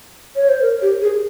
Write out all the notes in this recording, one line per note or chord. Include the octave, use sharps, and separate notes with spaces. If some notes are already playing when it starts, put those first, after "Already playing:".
C#5
C5
A#4
G4
G#4